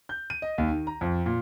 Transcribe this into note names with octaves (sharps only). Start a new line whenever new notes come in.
G6
D#7
D#5
D#2
D#3
A#5
F2
A#2